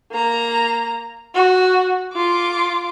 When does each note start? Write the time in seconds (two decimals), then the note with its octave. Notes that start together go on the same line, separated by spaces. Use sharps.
0.12 A#3 A#5
1.35 F#4
2.13 F4 D6